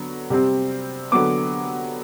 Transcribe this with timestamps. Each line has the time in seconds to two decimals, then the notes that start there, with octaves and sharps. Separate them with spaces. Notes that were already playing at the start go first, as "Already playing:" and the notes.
Already playing: D3 F#3 B3
0.30 C3 G3 C4
1.12 D3 F#3 B3 D6